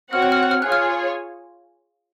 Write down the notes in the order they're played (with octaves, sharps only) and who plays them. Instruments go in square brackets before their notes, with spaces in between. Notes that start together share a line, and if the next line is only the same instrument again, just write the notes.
[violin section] C4 F#4 C#5 F#5 [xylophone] F6
[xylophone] F#6
F6
F#6
F6
[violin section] F4 G#4 C#5 G#5 [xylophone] F#6
[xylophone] F6